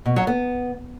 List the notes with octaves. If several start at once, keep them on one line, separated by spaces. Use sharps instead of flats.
B2
F#3
B3